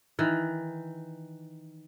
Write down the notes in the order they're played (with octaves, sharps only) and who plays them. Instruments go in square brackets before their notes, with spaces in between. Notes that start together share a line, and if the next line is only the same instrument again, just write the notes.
[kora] D#3 E3